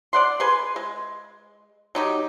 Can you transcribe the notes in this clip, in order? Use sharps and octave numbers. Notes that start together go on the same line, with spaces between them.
D5 F#5 C6
G#4 B4 C6
G#3
F#3 D#4 G4